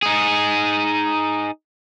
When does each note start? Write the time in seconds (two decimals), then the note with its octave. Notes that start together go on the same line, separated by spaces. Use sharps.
0.03 D#4 G#4